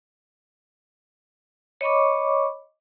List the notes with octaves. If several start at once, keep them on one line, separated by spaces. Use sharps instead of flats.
C#5 D#5 B5 C#6 D6